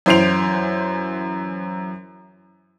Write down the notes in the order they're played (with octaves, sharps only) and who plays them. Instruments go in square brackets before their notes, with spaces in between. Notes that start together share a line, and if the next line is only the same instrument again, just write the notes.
[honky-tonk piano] F#2 E3 C5 C7 D7 F7